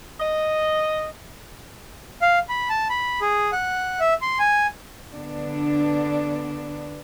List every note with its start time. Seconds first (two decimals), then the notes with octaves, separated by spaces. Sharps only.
0.19 D#5
2.22 F5
2.49 B5
2.69 A5
2.90 B5
3.21 G#4
3.53 F#5
4.00 E5
4.22 C6
4.39 G#5
5.13 D3 B3 D4